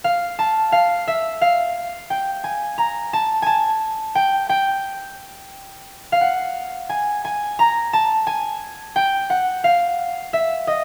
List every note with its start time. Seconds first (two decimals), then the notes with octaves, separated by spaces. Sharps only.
0.04 F5
0.39 A5
0.72 F5
1.08 E5
1.41 F5
2.10 G5
2.44 G#5
2.78 A#5
3.13 A5
3.42 G#5 A5
4.15 G5
4.49 G5
6.12 F5
6.21 F#5
6.89 G#5
7.25 G#5
7.59 A#5
7.93 A5
8.27 G#5
8.96 G5
9.30 F#5
9.64 F5
10.33 E5
10.67 D#5